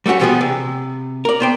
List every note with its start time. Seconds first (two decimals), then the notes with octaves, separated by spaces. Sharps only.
0.06 G3 A3 C#4 F#4 C#5
0.20 D3 E3 F3 G3 B3 G#4
0.41 C3
1.25 A#4 D5
1.40 B3 C5 G5